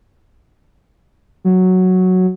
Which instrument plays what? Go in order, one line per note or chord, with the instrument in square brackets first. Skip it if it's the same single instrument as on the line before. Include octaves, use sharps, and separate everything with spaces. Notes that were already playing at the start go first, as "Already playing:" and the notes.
[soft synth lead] F#3